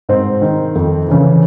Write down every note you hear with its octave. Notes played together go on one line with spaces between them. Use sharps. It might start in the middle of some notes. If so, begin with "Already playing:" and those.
G#2 C4
D#3
F2
C#3 E3